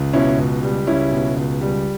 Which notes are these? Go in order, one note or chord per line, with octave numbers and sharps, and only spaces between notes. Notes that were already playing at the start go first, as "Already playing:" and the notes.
Already playing: C#2
B2 C#4 E4
C#2
G3
C#2 C#4 E4
B2
C#2
G3